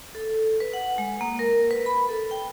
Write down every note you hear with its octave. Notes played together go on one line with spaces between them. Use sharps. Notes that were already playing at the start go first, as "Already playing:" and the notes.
A4
B4
F#5
G#3
A#3
A#4
B4
B5
A4
G5